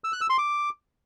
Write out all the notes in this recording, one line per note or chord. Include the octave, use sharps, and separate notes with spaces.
E6
F#6
E6
C6
D6